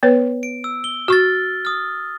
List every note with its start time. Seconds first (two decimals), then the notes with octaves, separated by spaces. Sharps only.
0.03 B3 B4 C#5
0.43 D7
0.64 E6
0.84 G7
1.08 F#4 C#6 F6 A6
1.65 D#6 F6